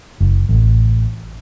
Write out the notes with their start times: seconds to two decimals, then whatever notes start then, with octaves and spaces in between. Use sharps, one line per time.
0.21 F#1
0.49 A1